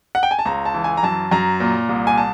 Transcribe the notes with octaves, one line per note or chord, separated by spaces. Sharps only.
F#5
G5
G#5
A5
C#2 A#5
A5
E3
G#5
A#5
F#2 A5
F#2 A#5
A#2
C2
G#5
A5